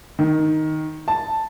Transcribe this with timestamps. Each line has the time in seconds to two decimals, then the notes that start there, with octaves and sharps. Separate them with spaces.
0.19 D#3
1.08 A5